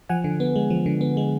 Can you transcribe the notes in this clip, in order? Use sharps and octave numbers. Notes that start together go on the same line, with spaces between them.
F3 F#5 G#5
D3
B3
G#3
F3
D3
B3
G#3